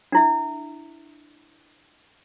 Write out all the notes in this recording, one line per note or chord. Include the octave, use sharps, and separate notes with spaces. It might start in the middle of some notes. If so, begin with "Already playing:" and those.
D4 E4 E5